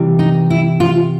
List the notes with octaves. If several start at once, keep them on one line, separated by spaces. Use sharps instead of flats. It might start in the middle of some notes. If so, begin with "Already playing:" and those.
Already playing: C3 E3 G3
D#4
E4
F4